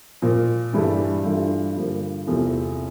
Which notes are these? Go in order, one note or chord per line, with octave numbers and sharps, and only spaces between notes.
A#2 F3 A#3
G2 E3 G3 D4 A4
G2 E3 A3 D4 F4
G2 D3 F3 A#3
E2 C3 F3 A3 C4